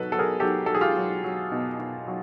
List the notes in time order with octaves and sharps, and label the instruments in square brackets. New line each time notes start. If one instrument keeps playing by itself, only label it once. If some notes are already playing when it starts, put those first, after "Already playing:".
Already playing: [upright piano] B2 F#3 A4 B4
F#3 A4
G#4 A#4
F#3 G4 A4
F#3 A4
G#4
F4 G4
F#3
F#3
B2
B2
F#3